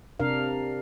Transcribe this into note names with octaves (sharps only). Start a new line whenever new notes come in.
C3 D4 A#4 F5